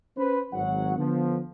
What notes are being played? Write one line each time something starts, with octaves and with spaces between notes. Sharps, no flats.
C#4 B4 C5
G#1 F#3 F#5
D3 F3 B3